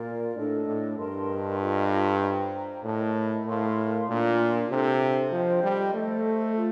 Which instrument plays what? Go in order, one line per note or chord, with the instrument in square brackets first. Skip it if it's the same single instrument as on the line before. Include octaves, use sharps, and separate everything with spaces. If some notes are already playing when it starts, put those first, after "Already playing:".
Already playing: [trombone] A#2 [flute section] F4 A#4 D5
[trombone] A2 [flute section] D4 A4 D#5
[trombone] A2
[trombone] G2 [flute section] A#4 D#5 A5 C6
[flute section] F4 A4 D#5
C5 G5 A#5
[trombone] A2 [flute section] A#4 D#5 A5
[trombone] A2 [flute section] A#4 F5 C6
[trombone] A#2 [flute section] D4 F4 A#4
[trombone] C3 [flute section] D4 A4 C5
[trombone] F3 [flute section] C5 D#5 G5
[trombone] G3
[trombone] A3 [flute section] A4 C5 D#5
[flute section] F4 A4